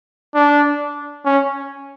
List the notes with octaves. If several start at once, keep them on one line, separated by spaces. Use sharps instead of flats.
D4
C#4